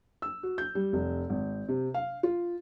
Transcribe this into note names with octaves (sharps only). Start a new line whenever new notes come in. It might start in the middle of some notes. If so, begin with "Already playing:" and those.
E6
F#4
G6
G3
F1
G#1
C3
F5
F4